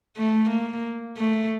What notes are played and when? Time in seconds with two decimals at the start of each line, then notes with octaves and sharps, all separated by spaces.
0.17 A3
0.50 A#3
1.17 A3